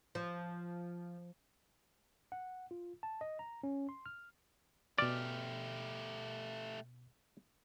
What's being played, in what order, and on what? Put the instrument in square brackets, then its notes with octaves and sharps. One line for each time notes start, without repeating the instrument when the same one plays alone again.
[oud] F3
[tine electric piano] F#5
F4
A5
D#5
A#5
C#4
C6
F6
[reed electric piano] B2 F6 [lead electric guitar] A3 G4 [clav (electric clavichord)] D5